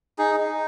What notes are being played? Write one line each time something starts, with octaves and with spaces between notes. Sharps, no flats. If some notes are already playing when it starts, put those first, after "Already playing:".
D#4 G#4
D#4